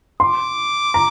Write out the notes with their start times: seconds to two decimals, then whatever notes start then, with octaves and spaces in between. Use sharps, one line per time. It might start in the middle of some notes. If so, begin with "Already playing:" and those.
0.20 C6 D6
0.94 A#5